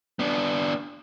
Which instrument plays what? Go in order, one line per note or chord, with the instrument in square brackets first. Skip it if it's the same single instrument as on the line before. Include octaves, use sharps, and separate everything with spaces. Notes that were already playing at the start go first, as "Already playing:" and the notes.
[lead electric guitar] B3 D4